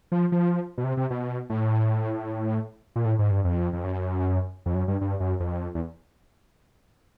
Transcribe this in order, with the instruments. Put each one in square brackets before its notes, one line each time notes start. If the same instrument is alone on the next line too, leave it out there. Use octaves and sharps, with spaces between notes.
[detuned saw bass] F3
F3
B2
C3
C3
B2
A2
A#2
A2
G#2
G2
F2
F2
F#2
F2
F#2
G2
G2
F#2
F2
E2